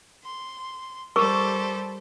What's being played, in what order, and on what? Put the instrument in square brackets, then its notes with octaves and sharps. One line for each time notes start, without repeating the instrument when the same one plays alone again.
[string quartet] C6
[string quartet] G3 A4 C5 [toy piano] A#4 C#6 D6